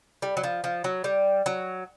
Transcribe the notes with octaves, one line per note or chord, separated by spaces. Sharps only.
G3
F#3
F3
F3
F#3
G3
F#3